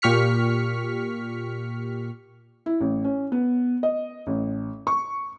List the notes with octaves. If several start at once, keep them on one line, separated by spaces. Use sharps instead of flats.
A#2 G4 C#6 F6 B6 C#7
E4
A1
C#4
B3
D#5
A1
C#6